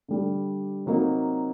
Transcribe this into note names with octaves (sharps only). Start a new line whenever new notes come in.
D3 G3 D4
C3 F#3 A#3 D#4